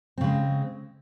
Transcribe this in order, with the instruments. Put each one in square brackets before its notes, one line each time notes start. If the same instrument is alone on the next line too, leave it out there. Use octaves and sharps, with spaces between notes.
[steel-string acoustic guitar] C4
C#3
G#3